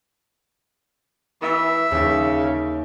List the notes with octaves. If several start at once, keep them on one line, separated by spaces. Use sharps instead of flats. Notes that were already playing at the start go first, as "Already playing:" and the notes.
E3 E5
D#2 C#3